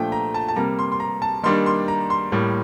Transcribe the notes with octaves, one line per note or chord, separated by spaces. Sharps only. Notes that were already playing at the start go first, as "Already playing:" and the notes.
Already playing: A#2 F3 A3 D4 G5
A#5
A5
A5
C3 G3 A#3 A#5
C6
C6
A#5
A5
D#3 G3 A#3 D4 C6
C6
A#5
C6
A2 G3 A#3